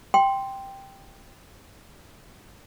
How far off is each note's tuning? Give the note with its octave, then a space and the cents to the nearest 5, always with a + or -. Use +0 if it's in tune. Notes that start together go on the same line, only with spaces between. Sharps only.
G5 +0 C6 +0